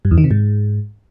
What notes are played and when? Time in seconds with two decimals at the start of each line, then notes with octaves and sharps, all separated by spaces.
0.05 G2
0.11 E2
0.18 D#3
0.24 C3
0.31 G#2